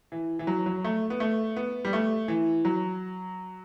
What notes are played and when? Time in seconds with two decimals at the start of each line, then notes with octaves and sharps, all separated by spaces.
0.12 E3
0.39 E3
0.47 F#3
0.66 F#3
0.84 A3
1.10 B3
1.20 A3
1.56 B3
1.85 G3
1.93 A3
2.28 E3
2.65 F#3